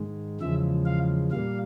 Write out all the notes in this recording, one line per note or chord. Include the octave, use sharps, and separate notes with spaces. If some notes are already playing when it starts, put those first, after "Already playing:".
Already playing: G#2 D#3 G#3
E2 C#3 F3 G#3 E5
F5
A#2 G3 A#3 F5